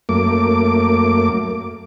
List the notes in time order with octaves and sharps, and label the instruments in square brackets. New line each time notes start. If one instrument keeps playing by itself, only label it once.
[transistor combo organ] F#2 A3 A#3 D6